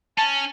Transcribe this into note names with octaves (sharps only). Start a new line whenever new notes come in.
C#4 A5